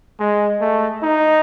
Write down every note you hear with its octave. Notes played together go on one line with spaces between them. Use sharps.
G#3 D#5
A3
D#4